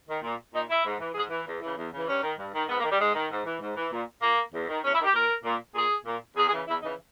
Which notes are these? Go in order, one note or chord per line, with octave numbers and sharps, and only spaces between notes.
D#3
A#2
A#2 D#4
E4
G#2
E3
G#2 G#4
E3
E2
C#3 E3
E2
C#3 E3
G2 C#4
D#3
G2
D#3
G#2 B3
A#3
D#3
G3
G#2 G#3
D#3
G#2
E3
G#2
E3
A#2
A#2 A#3
E2
D#3
E2 C#4
E4
D#3 G4
A#2 A#4
A#2
A#2 G#4
A#2
E2 G#4
G#4
C#3 E3
E2 E4
C#3 E3 D#4